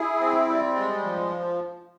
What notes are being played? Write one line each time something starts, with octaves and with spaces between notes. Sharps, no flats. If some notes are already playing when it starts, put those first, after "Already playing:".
Already playing: E4 G#4
C4
G3
G#3
F3